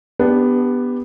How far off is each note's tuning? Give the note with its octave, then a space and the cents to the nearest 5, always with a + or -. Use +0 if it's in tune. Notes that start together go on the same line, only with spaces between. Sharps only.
B3 +0 D4 +0 G4 +15